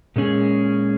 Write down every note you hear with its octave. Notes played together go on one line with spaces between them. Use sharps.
A#2 G#3 C#4 G#4